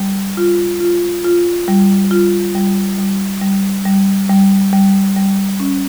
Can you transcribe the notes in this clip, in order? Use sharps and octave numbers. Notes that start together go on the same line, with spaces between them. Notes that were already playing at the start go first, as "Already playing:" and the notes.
Already playing: G3
F4
F4
F4
G3
F4
G3
G3
G3
G3
G3
G3
G3
C#4